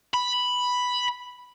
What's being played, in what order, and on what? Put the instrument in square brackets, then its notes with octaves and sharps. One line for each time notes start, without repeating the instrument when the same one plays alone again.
[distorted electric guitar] B5